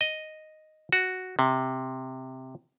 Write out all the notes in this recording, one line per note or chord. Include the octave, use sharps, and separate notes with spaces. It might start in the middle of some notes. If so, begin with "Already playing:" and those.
D#5
F#4
C3